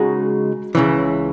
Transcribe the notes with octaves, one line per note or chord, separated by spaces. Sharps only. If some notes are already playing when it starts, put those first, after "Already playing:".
Already playing: C#3 G#3 D#4 F#4
C#2 C#3 E3